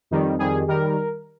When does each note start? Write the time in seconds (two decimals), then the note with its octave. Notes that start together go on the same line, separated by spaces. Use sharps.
0.11 F2 D#3 G3
0.39 F2 D#3 G3 G#4
0.68 D#3 G3 A#4